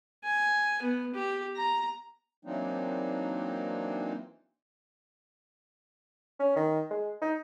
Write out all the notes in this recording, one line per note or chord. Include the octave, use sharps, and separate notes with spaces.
G#5
B3
G4
A#5
E3 F#3 A#3 C4 D4 D#4
C#4
D#3
G#3
D#4